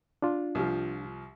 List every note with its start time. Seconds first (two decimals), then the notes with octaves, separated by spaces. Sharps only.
0.22 D4 F4
0.55 C2 F3